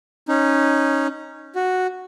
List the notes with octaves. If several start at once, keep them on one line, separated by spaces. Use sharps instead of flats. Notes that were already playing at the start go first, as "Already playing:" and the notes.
C#4 D#4
F#4